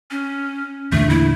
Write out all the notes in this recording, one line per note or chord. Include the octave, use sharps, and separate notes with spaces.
C#4
E2 A#2 D3 A3
E4